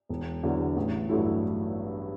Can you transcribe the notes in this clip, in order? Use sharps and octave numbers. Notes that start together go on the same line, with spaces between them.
E1
E2 D3 F#3
A1
G2 F#3 A3 E4